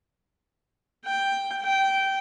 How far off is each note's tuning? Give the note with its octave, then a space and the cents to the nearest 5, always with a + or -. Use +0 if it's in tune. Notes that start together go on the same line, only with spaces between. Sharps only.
G5 +5
G5 -15